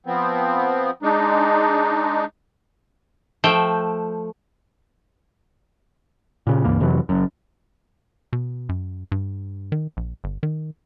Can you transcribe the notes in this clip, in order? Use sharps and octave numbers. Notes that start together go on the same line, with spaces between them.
F3 B3 C4
G#3 D4 D#4
F3 A3 G5
A#2 C#3
C#2 G2 E3 A#3
F2 C3 E3 F#3
F#1 F#2
B2
F#2
G2
D#3
A#1
G1
D#3